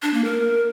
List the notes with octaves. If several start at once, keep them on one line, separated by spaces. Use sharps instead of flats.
D4
A#3
A#4